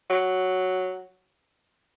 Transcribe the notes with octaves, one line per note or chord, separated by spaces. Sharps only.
F#3